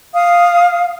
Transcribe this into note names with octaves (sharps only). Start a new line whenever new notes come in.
F5 D#6